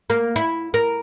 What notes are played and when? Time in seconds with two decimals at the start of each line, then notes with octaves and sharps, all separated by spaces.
0.10 A#3
0.36 E4
0.74 A#4